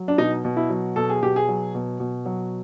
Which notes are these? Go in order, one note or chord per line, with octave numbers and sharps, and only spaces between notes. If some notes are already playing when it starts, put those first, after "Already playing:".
Already playing: F#3
D4
B2 D#4
B2
E4
F#3
B2 A4
G#4
B2 G4
G#4
F#3
B2
B2
F#3